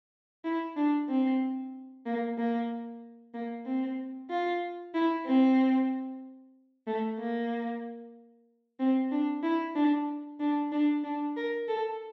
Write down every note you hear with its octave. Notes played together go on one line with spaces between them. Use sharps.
E4
D4
C4
A#3
A#3
A#3
C4
F4
E4
C4
A3
A#3
C4
D4
E4
D4
D4
D4
D4
A#4
A4